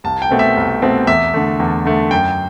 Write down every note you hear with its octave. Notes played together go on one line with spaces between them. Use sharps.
C2 A5
G5
B2 A3 C4
E5
C2
B2 A3 C4
E2 E5
D3 A3
E2
D3 A3
F#2 G5